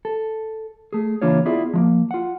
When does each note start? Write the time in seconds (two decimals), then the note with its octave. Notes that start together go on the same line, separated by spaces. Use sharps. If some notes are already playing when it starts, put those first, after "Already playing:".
0.05 A4
0.93 A3 G#4
1.22 C#2 E3 A#3 D4 F4 C#5
1.46 B3 E4 F4 G#4 D5
1.73 F3 G#3 A#3
2.11 F4 F#5